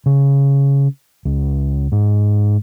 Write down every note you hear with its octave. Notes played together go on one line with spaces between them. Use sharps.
C#3
C#2
G#2